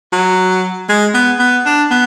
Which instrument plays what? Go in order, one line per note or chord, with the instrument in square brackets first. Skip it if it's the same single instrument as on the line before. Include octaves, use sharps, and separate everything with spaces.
[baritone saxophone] F#3
G#3
B3
B3
D4
B3